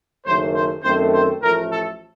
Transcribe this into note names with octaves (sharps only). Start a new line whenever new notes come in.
F#1 F#2 D#3 A3 C5
C5
F#2 D#3 A3 C4 C5
C5
A1 A2 F3 A3 A#4
A4